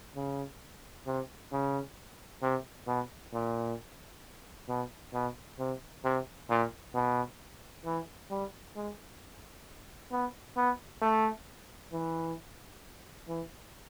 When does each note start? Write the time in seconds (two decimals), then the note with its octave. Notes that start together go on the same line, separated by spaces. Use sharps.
0.16 C#3
1.07 C3
1.52 C#3
2.42 C3
2.87 B2
3.34 A#2
4.69 B2
5.14 B2
5.59 C3
6.05 C3
6.50 A#2
6.94 B2
7.85 E3
8.31 G3
8.76 G#3
10.12 B3
10.57 B3
11.02 A3
11.93 E3
13.28 E3